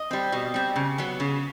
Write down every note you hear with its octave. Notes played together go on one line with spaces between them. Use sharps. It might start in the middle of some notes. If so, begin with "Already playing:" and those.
Already playing: D#5
G3 C4
B2
G3 C4
C#3
F#3 B3
C#3